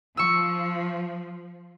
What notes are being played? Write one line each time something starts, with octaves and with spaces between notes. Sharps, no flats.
F3 C#6 E6